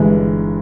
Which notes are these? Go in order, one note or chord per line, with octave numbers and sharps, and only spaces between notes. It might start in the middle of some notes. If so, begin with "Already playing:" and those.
Already playing: G1 G2 E3 G#3